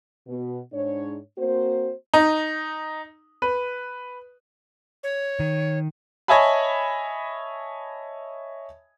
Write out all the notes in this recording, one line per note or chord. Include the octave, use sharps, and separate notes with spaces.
B2
G#2 D4 C#5
A#3 C4 F#4 C5
D#4
B4
C#5
D#3
C#5 D#5 E5 G#5 A5 B5